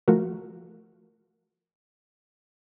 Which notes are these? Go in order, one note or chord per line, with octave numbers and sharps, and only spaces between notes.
F3 A3 F#4 A#4